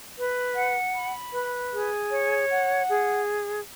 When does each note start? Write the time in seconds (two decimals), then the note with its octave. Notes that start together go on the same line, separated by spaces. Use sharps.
0.17 B4
0.56 F#5
0.94 B5
1.33 B4
1.72 G#4
2.11 C#5
2.49 F#5
2.88 G#4